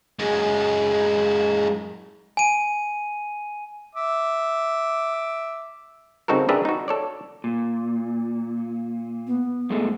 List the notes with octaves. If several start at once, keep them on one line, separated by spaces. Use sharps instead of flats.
F#2 G#3
G#5 D#7
E5 D6
C#3 C4 D#4 F#4 A4 A#4
D4 G4 G#4 A#4 B4 E5
D#4 F#4
A4 C#5 D5
A#2
B3
F#2 G#3 A3